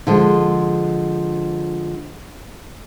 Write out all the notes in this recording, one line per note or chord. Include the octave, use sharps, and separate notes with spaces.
D3 F3 G#3